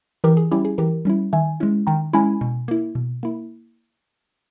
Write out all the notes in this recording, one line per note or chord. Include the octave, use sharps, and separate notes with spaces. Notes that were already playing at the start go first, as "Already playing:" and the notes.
E3 G4 A#4
G#4
G3 C#4 E4 G4
G#4
E3 G4 A#4
G3 C#4 E4
D#3 E5 G#5
G#3 C#4 E4
D#3 G5 A#5
G#3 C#4 E4 G#5 B5
B2
A#3 E4
B2
A#3 E4